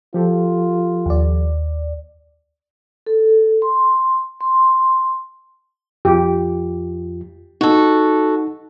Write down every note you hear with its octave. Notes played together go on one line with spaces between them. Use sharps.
F3 F4 G4 A4
D#2 D5
A4
C6
C6
F2 F4 G4
D#4 F#4 A4